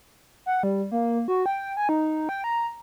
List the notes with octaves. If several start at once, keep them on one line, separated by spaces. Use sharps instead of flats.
F#5
G3
A#3
F#4
G5
G#5
D#4
G5
A#5